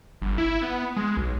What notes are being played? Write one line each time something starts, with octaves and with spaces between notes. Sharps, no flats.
G1
E4
B3
G#3
B1